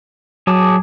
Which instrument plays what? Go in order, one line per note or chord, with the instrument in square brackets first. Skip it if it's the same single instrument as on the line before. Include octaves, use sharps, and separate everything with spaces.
[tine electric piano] F#3 [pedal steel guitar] G#4 A5 D6